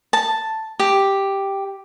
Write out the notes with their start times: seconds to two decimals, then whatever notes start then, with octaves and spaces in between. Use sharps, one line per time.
0.13 A5
0.80 G4